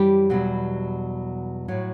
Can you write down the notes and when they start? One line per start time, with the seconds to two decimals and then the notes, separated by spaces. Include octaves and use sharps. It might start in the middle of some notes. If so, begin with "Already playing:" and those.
Already playing: F#2 E3 G3 G4
0.30 E2 B2 F#3
1.68 A2 F#3